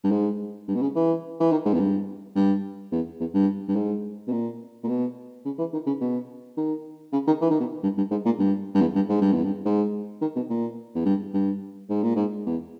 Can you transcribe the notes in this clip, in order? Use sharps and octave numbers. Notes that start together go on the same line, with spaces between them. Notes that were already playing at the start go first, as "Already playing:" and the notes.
G2
G#2
G2
B2
C#3
E3
E3
D#3
G#2
E2
G2
G2
E2
E2
G2
G2
G#2
B2
A#2
A#2
B2
C#3
E3
D#3
C#3
B2
D#3
C#3
D#3
E3
D#3
B2
G2
G2
G#2
A#2
G2
G2
E2
G2
G#2
G2
E2
G2
G#2
D#3
B2
A#2
E2
G2
G2
G#2
A#2
G#2
E2